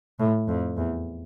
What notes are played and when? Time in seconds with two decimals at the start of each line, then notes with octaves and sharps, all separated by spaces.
0.19 A2
0.49 F2
0.77 E2